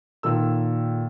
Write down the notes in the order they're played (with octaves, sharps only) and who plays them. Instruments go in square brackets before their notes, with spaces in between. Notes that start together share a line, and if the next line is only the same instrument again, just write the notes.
[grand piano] A#2 D#3 A4 E6